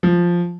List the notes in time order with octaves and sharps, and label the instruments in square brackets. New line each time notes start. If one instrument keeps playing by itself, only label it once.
[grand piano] F3